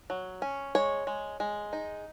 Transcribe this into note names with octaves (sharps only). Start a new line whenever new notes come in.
F#3
C#4
G#3 C#5
G#3
G#3
D#4